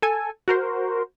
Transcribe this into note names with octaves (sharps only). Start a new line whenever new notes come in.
A4 G#5
F#4 A#4 C5